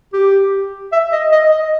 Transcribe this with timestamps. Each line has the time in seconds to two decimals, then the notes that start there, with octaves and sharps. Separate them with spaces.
0.13 G4
0.92 E5
1.12 D#5
1.32 D#5
1.51 D#5